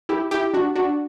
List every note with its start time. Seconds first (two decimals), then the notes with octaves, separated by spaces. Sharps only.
0.09 E4 G4
0.31 E4 G4
0.54 D4 F#4
0.75 D4 F#4